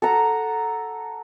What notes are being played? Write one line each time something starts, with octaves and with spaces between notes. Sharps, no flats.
A4 F#5 A#5